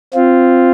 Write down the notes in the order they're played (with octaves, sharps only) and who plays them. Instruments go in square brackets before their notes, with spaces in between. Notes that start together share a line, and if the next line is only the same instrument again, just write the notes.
[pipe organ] C4 F4